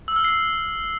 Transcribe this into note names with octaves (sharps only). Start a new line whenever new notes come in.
E6
F6
C7